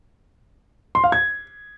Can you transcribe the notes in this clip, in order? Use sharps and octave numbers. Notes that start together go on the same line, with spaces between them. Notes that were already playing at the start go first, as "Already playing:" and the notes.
C6
F5
G#6